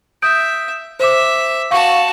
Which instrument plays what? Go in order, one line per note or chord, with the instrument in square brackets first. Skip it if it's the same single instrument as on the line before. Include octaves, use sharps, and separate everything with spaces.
[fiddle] E5 [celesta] D#6 G6 D7
[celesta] C5 D6 [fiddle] E5
[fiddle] F#4 A5 [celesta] F5 C#6